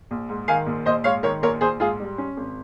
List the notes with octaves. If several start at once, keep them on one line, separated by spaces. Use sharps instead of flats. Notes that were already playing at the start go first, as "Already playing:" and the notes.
A#1
G#2
D#3 F5 G#5
A#1
A#1 C5 D#5
G#2 C#5 F5
D#3 A#4 C#5
A#1 A#4 C#5
A#1 G#4 C5
G#2 F4 G#4
G3
C#4
G#1